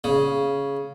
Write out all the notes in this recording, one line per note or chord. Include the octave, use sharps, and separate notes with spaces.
C#3